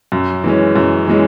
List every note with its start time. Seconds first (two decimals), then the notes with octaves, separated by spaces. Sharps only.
0.12 F#2
0.44 E3 G#3 C#4
0.76 F#2
1.08 E3 G#3 C#4